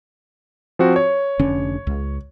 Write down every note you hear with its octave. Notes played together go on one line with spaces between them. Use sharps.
F3 C4 F#4
C#5
F1 D3 C#4
C#2